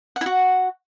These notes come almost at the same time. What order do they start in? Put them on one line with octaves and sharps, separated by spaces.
F#5 E4 F#4